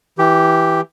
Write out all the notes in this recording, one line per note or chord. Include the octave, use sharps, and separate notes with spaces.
E3 G4